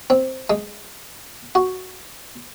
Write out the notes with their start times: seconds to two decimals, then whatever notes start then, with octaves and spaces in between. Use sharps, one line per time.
0.10 C4
0.50 G#3
1.55 F#4